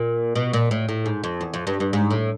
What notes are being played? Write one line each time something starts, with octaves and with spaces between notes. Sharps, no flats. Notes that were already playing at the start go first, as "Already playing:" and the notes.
Already playing: A#2
B2
A#2
A2
A2
G#2
F2
E2
F2
G2
G2
G#2
A2